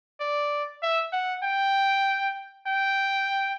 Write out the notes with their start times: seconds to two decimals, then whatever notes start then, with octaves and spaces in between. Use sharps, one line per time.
0.20 D5
0.82 E5
1.13 F#5
1.44 G5
2.67 G5